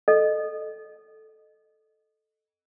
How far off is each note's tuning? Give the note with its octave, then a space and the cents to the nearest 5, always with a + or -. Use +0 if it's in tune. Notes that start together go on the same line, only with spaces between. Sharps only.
A4 -5 D#5 -20